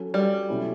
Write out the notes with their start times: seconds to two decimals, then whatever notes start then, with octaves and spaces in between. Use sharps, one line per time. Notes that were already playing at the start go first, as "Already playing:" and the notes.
Already playing: F#3 C#4 F#4 A4
0.14 G3
0.48 B2 F#3 C#4 E4 A4